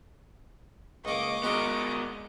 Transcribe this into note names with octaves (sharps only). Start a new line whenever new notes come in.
C#2 A#3 D#5 C#6 D6
G#3 B3 D#4 F#4 A#4 D#5